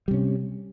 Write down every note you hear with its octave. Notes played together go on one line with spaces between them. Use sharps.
C3 G3 C#4